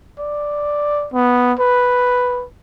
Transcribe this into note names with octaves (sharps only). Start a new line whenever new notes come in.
D5
B3
B4